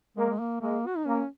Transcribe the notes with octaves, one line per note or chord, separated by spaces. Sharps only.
G#3 A#3
G#3
A#3
G#3 A#3
F#4
D#4
A#3 C#4